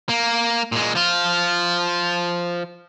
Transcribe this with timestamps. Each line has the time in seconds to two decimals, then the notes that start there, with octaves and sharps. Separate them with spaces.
0.09 A#3
0.72 A#2 G#3
0.95 F3 F4